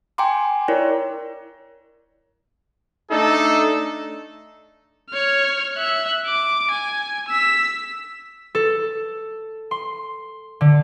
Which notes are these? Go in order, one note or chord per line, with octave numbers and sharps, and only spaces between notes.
G5 G#5 A#5 C6 D6
E4 A#4 C#5 D5
A3 D4 D#4 A4
C#5 F6
E5 F#6
D6
G#5
E6 B6
A4
C6
D3